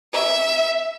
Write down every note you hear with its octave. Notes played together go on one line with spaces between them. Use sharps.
E5